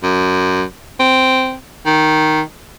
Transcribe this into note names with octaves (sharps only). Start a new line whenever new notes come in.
F#2
C4
D#3